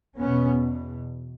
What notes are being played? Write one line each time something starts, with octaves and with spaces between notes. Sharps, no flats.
E2 B2 B3 C#4